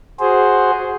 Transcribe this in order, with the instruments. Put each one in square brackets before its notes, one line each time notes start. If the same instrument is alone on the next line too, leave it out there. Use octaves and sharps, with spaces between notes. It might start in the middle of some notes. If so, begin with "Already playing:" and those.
[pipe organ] F#4 G#4 C5